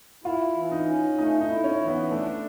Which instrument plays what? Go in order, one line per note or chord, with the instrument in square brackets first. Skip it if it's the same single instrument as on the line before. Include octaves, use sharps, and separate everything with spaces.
[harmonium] E4 [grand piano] F4
[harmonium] E3
[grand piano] D#4
[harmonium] C#4
[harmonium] A3 [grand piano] D#4
[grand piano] D#4
[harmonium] E4
[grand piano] C#4
[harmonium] E3
[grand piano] B3
[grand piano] A3 [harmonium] D4